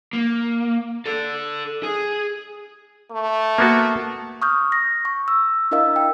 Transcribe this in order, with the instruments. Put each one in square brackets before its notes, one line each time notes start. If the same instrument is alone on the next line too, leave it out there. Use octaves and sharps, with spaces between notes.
[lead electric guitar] A#3
A4 D5
G#4
[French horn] A3
[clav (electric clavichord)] A#3 B3 F#4
[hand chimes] C#6 D#6 F6 G6
A#6
C#6
E6
D4 E4 A#4 D#5 F5 E6
G5